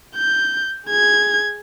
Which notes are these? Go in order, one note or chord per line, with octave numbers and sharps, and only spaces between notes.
G6
G#4 G#6